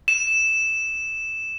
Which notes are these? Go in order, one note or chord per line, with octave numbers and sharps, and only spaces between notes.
E7